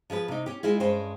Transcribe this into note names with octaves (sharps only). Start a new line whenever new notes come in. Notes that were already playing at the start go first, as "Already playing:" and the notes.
F3 G#4 A4 B4
C3 D#4
C#4 G4
G#3 E4 F4 G#4
G2 G#3 C#4 C5 G5